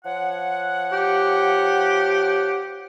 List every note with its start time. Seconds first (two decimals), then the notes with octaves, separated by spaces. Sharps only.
0.05 F3 C#5 F#5
0.92 G4